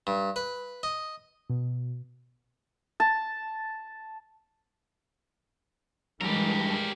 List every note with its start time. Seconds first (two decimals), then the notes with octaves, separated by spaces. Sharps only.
0.07 G2
0.36 B4
0.83 D#5
1.50 B2
3.00 A5
6.21 F#2 E3 G3 G#3 G4 A#4